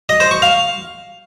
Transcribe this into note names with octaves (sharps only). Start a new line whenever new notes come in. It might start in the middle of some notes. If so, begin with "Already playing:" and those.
D#5
C5
C#6
F5